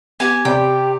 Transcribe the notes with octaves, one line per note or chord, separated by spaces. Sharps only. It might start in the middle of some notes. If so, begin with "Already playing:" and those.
B3 G4 G#5
C3 D5 G5 B5